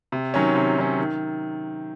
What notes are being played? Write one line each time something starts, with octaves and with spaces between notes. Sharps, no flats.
C3
D#3 F#3 C#4
C3
D#3 F#3 C#4
D#3